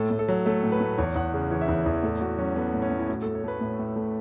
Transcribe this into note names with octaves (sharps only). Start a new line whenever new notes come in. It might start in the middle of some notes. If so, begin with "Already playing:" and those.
Already playing: A2 A4
A2
A4
F#3
A3 A4
A2
B4
A2
E2 C#5
E2 F#5
C#3
E3 C#5
E5
E2 C#5
E2
A2 A4
A2 F#4
F#3 C#4
A3 B3
A2
C#4
A2
E4
A2 F#4
A3 A4
C#5
A3 B4
A2
A2
A3